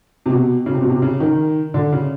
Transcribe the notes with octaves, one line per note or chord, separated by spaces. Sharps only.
C3
B2
C#3
C3
B2
C3
C#3
D#3
D3
C#3